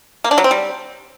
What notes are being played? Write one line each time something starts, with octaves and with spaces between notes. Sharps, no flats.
A#3
D4
F#3
C4
G3